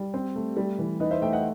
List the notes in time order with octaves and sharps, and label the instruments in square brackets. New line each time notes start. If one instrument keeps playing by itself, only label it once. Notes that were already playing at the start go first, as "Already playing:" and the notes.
Already playing: [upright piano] G3
C4
A3
G3
E3
D#4 B4 D#5
C5 E5
A3 E5 G5
D#5 F#5